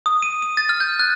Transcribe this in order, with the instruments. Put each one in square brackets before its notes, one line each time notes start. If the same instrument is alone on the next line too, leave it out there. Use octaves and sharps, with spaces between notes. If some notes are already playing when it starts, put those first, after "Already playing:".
[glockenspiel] D#6
D#7
D#7
A6
F6
G6
F#6